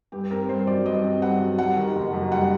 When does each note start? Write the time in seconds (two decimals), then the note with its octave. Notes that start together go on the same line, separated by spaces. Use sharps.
0.12 G2 G4
0.30 C4 A#4
0.49 G2 C5
0.67 F#3 D5
0.86 G2 D#5
1.04 C4 D#5
1.22 G2 F#5
1.40 F#3
1.58 G3 F#5
1.77 D#3
1.95 F#1
2.13 F#2
2.32 G3 F#5